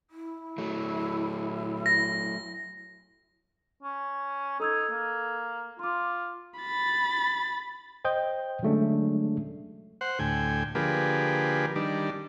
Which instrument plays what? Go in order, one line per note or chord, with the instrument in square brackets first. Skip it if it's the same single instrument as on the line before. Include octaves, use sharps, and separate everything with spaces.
[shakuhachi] E4
[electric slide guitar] F#3 A3
[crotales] A#6
[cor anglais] C#4
[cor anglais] D#4 [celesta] A4 E6 G#6
[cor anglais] A#3
[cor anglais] F4 [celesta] C6 D6
[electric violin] B5 A6
[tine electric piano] C5 D#5 G5 D#6 G6
D3 F#3 G#3 A3 C#4 D4
[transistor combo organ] C5 F#5
D2 A2 G5 G#5
D3 F3 A#3 G4 G#4 B4
D#3 G3 D4